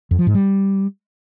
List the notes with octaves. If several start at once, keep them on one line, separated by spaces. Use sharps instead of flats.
F2
F3
G#2
G3